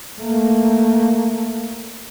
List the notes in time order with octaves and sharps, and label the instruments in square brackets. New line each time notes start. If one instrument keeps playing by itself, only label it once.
[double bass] A3 A#3